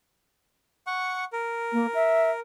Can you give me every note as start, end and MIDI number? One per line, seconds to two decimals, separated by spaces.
0.87 1.24 78
0.87 1.24 85
1.33 2.40 70
1.73 1.87 58
1.94 2.30 76